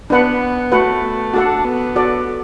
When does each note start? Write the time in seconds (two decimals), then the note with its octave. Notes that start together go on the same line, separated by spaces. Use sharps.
0.10 B3 D4 B4 F#5
0.72 A3 F#4 B4 F#5
1.34 D4 F#4 A4 F#5
1.64 B3
1.96 F#4 A4 D5